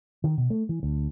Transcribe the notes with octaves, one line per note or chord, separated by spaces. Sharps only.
D#3
B2
A3
E3
D2